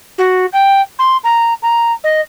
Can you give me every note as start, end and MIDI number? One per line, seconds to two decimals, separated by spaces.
0.18 0.45 66
0.52 0.81 79
0.98 1.17 84
1.23 1.53 82
1.62 1.92 82
2.03 2.20 75